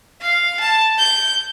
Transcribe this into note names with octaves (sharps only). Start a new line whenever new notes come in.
F5
A5
G6